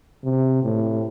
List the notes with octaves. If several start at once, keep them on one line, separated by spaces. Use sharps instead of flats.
C3
A2